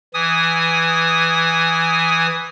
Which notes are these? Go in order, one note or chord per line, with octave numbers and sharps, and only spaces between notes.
E3 G#5 D#6